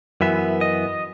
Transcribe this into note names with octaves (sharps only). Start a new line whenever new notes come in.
F#2 E3 B3 E5
D#5